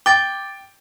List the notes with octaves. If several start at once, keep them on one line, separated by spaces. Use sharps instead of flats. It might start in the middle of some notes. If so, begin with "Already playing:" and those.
G5 D6 A6